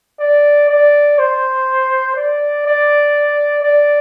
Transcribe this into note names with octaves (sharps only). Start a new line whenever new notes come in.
D5
D5
C5
D5
D5
D5